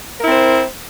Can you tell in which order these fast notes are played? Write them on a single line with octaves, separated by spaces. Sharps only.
A#4 E4 C4 C5